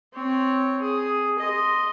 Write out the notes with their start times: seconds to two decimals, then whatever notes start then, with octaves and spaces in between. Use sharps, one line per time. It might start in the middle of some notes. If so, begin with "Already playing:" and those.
0.13 C4 C#5
0.82 G#4
1.39 D#5 C6